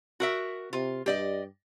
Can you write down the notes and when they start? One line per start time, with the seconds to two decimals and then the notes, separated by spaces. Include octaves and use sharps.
0.20 F#4 A#4 E5
0.73 C3 F4
1.06 G2 G4 D5 D#5